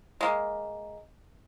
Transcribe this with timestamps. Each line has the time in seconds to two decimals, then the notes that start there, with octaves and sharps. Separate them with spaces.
0.21 G#3 A#3